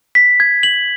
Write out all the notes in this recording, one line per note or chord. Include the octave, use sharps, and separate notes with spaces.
B6
G#6
F#7